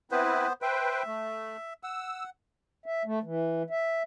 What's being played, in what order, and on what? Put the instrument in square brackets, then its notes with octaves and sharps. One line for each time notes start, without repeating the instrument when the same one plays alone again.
[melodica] B3 C5 [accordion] C4 E4 B4
[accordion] B4 C5 G5 [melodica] E5
[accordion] A3
[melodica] F#5 [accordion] E6
[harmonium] E5
A3
E3
E5